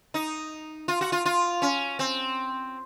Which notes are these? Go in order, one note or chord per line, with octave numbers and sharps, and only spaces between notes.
D#4
F4
F#4
F4
F4
C#4
C4